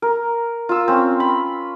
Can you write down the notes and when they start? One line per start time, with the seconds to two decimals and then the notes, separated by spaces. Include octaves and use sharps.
0.02 A#4
0.69 F4 E6
0.88 C4 C#4
1.20 B5